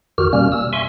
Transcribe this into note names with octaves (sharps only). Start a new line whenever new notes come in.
F2 D#3 F#4 G4 F6
B2 G3 A#3 C#4 F6
E6
E5 G#5 C6 C#6